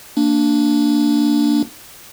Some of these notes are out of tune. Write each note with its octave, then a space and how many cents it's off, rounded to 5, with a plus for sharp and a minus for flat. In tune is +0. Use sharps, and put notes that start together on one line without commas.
A#3 -20 D4 +0